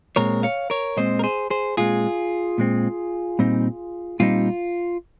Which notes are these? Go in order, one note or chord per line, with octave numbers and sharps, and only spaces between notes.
A#2 G#3 C4 A#4 C#5
C#5 F5
A#4 C#5
A#2 G#3 C4 C5 D#5
A#4
G#4 C5
G#4 C5
A#2 G#3 C4 F4 G#4
A#2 G#3 C4
A#2 G3 C4 D#4
A#2 G3 C4 D#4 F4